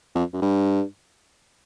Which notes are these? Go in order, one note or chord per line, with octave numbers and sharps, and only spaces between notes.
F2
F#2
G2